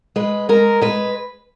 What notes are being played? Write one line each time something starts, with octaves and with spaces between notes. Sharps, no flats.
G#3 B4
G#3 A#4
G#3 B4